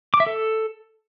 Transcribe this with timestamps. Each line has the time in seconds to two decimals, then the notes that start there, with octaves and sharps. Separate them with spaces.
0.14 D6
0.20 E5
0.26 A4